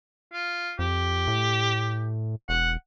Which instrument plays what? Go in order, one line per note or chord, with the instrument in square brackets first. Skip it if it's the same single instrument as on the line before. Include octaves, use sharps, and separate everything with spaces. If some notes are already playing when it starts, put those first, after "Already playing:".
[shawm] F4
[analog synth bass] F2 [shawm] G4
[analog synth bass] A2
[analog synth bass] E1 [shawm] F#5